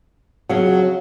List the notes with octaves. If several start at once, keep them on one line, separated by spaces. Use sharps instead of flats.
F2 C#3 F#3